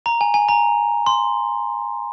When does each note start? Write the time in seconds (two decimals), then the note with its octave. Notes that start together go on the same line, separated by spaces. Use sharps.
0.06 A#5
0.21 G#5
0.34 G#5
0.49 A#5
1.06 C6